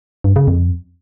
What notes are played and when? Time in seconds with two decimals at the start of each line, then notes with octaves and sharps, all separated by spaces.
0.24 G2
0.36 C#3
0.48 F2